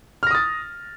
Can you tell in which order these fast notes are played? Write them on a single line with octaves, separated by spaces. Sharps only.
F6 A#6 D#6 A6